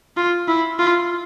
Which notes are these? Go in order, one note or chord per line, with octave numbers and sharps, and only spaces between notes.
F4
E4
F4